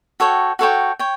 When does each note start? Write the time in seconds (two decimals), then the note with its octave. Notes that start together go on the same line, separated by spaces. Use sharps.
0.20 F#4 A4 C#5 G5
0.59 F#4 A4 C#5 G5
0.99 C#5 G5